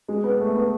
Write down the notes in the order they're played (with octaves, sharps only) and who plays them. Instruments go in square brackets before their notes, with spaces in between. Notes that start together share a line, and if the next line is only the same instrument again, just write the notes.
[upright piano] G#3
B3
A3
B3